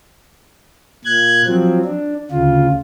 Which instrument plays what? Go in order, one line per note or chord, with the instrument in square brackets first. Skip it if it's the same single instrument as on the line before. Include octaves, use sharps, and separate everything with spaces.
[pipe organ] A#2 F#6 G#6
F3 F#3 C4
D4
D2 C#3 F4